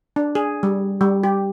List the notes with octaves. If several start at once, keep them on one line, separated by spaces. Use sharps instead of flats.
D4
G#4
G3
G3
G4